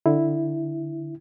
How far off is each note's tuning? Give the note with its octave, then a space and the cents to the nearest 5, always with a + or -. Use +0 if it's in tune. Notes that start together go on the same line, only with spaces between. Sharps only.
D3 +10 E4 +0